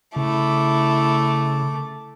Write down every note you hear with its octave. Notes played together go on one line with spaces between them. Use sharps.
C#3 A3 E4 D6